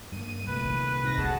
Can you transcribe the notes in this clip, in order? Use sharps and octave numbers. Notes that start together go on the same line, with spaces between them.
G2 A#3 D#7
C2 A#2 A3 B4
D#3
G#2 C3 G#3 A#6
F2 D3 F#4 G#4 A5